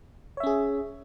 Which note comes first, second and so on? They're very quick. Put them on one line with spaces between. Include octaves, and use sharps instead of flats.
C#5 E5 C#4 G#4